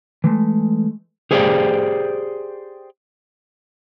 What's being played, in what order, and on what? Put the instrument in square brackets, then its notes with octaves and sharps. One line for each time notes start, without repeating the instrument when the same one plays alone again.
[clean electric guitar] E3 G#3 A3
[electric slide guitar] G4 G#4 C5 D5 E5 G5